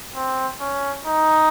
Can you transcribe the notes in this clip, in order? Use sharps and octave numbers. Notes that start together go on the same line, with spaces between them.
C4
C#4
D#4